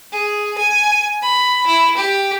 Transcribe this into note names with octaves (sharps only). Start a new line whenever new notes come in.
G#4
G#5
B5
E4
G4